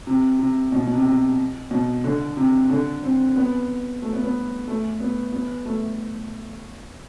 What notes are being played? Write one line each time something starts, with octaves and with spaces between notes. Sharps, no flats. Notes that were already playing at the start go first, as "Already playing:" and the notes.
C3
C3
B2
B2
C3
C3
B2
D3
C3
D3
C4
B3
A3
B3
B3
A3
B3
B3
A3